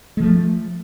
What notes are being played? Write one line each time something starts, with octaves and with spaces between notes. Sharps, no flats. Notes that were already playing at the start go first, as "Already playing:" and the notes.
F3 G#3 A3